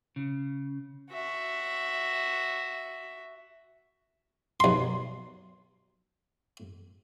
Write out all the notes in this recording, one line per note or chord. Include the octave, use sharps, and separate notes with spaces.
C#3
F#4 E5
B1 C6